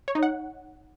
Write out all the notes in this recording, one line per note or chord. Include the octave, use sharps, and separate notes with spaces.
C#5
D#4
F#5